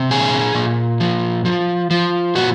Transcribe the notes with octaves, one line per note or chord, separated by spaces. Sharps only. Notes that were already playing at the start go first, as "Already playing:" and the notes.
Already playing: C3
A#2 G#4
A#2
F3
F3
F3
A#2 F#4